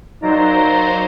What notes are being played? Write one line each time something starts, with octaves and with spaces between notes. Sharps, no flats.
F#3 A#3 D#4 C5 D5 A#5